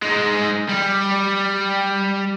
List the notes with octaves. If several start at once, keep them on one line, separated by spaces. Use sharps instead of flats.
G#3 D#4
G3